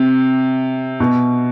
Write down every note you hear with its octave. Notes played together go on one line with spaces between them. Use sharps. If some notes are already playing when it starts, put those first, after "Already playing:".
Already playing: C3
B2